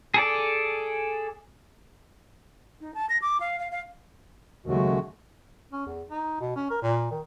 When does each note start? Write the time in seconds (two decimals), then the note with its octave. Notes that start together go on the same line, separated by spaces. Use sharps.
0.14 G#4 A4 D5
2.81 D#4
2.94 A5
3.09 A#6
3.22 D6
3.40 F5
3.59 F5
3.71 F5
4.66 D#2 C#3 F#3 G#3 A3 F#4
5.72 C#4
5.87 E2
6.10 D#4
6.41 B2
6.56 C#4
6.70 A#4
6.82 A#2
7.11 D#3